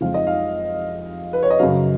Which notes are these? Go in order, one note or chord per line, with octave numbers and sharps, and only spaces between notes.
F2 F3 G#3 F5
D#5
F5
B4
C#5
D#5
F#2 C#3 F#3 F5